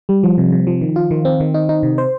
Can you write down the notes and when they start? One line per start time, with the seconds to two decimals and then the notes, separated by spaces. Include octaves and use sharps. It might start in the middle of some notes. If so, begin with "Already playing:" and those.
0.09 G3
0.23 F3
0.38 C3
0.52 C3
0.67 F3
0.81 D#3
0.96 F4
1.11 D#3
1.25 C4
1.40 D#3
1.54 D#4
1.69 D#4
1.83 C3
1.98 C5